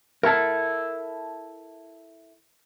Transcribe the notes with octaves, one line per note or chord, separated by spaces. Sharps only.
E4 A4 A#4 F#5 A5